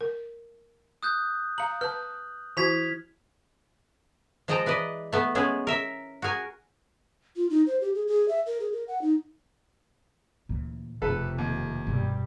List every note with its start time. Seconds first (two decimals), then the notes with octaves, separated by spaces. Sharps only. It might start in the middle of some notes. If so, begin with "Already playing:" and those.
0.01 A#4
1.03 D#6 F#6 G6
1.58 F5 A#5 F#7
1.81 B4 A5 F6
2.57 E3 E4 F#4 G#6 B6 F7
4.48 F3 G#3 D#5 G5 A5 A#5
4.66 E3 B4 D5 D#5
5.12 A3 B3
5.35 G#3 A3 B3 C#4 G#4
5.67 A#4 E5
6.22 F#4 G#4 A#4 G#5
7.36 F4
7.50 D#4
7.67 C5
7.81 G4
7.95 G#4
8.08 G#4
8.28 E5
8.46 A#4
8.60 G#4
8.72 A#4
8.88 F#5
9.02 D#4
10.49 D2 A#2 E3
11.02 E1 F2 C3 A3 A4 B4
11.38 D#2
11.87 G2 B2 G3